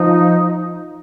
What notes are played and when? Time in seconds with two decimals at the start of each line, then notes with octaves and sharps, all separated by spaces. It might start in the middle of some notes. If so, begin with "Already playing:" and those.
Already playing: F3 D#4